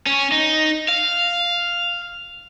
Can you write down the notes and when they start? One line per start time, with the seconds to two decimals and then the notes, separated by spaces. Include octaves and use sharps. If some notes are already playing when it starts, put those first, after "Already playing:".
0.06 C#4
0.32 D#4
0.88 F5